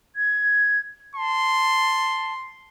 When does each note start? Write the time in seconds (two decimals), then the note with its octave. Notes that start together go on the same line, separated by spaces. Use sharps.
0.16 G#6
1.15 A5 C6